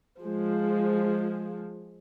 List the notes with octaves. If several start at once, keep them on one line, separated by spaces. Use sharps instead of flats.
F3 G#3